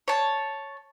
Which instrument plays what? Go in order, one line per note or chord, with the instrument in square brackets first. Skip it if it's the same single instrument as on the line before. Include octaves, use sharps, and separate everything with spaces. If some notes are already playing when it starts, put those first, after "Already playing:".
[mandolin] C#5 A5